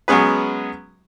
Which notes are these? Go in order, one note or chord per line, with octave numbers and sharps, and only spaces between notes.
F#3 G#3 B3 C#4 G#4 B4